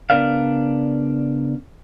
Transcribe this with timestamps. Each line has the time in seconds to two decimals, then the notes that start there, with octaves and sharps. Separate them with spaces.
0.10 C#3 B3 D4 A#4 D5 F5